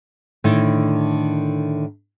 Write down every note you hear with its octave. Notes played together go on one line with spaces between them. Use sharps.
A2 D3 D#3 E4